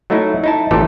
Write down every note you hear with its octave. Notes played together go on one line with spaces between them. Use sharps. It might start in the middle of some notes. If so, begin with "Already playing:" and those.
F#3 A3 D#4 E4
D#4 E4 A5
A1 A#2 E3 A3 G4 A4